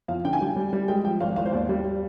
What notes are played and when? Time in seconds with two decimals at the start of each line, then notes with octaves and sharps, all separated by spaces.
0.08 F2 F5
0.25 D3 G5
0.33 G#5
0.41 G3 G5
0.56 G3
0.73 G3
0.88 G#3 G5
1.04 F3 G5
1.21 G#1 F5
1.36 G#1 F5
1.45 C5
1.53 D#2 D5
1.69 G3